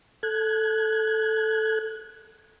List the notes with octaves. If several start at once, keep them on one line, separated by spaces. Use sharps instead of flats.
A4 F#6 G#6